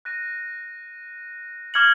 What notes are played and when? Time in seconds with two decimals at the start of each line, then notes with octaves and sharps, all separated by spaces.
0.05 F#6 A#6 D#7
1.74 D6 F6 G#6 C#7 F#7